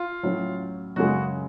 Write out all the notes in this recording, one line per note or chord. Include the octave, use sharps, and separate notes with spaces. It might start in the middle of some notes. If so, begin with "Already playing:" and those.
Already playing: F4
A2 F#3 C#4
F#2 C#3 G#3 F#4